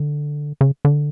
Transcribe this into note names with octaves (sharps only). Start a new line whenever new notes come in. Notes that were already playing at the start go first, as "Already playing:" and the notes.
Already playing: D3
C#3
D3